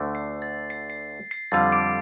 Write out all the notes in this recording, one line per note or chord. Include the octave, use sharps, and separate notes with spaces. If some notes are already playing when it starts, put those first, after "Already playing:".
Already playing: D2 D3 A3 D4
C7
A6
C7
C7
C7
F2 D3 G3 F4 A6
D6 D7